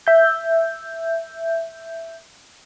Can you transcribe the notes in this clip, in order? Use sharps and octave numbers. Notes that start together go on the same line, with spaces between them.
E5 G6